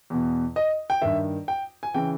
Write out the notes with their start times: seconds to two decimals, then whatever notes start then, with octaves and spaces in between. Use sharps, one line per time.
0.10 E2 B2
0.56 D#5
0.90 G5
1.02 G2 D#3 E5
1.48 G5
1.83 G#5
1.94 C#3 E3 G5